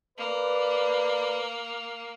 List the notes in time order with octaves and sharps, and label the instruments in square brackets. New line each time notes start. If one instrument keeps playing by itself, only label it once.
[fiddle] A#3 [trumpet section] B4 D5